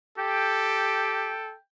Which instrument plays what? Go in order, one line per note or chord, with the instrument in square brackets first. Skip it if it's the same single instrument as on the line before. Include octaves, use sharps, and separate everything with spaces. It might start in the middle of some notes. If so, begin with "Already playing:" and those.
[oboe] G4 [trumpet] A4 [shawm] G5